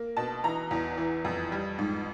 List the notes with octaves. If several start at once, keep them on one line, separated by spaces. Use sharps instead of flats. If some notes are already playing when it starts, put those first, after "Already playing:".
Already playing: A#3
B2 A5
E3 A#5
E2
E3
F2
G3
G#2